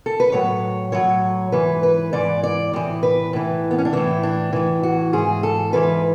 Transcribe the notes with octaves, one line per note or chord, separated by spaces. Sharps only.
A4
B4
A2 F#3 C#5
A2 F#3 C#5
G#2 E3 B4
B4
G#2 E3 D5
D5
A2 E3
B4
A2 E3
B3
C#4
D4
A2 E3 E4
D4
A2 E3
F#4
G#2 G#4
E3
A4
G#2 E3 B4